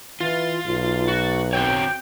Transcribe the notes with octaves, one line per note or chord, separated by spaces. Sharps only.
E3 F4 A6
B1
F#4
C4 F#4 C#5 G5